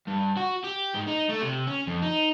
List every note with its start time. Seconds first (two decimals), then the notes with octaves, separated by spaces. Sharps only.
0.07 G2
0.37 F#4
0.64 G4
0.95 G#2
1.08 D#4
1.30 A3
1.41 C3
1.67 C#4
1.87 F2
2.02 D#4